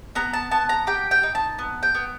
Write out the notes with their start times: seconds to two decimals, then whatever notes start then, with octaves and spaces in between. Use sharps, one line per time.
0.15 B3 A#5
0.33 A5
0.51 B3 A5
0.69 A#5
0.87 G4 G5
1.11 G5
1.23 D#4
1.35 A5
1.59 B3
1.83 G5
1.95 B3